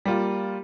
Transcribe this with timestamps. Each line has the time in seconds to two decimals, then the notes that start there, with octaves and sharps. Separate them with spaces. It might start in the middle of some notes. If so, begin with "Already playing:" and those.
0.05 G3 A#3 F4